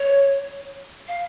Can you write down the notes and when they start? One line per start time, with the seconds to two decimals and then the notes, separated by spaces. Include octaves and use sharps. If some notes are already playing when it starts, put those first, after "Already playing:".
Already playing: C#5
1.08 F5